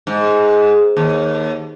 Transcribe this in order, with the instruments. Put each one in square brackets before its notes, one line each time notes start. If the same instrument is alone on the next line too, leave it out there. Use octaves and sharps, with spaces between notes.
[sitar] G#2
D#2